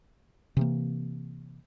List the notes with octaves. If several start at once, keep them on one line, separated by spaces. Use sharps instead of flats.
C3 E3 A#3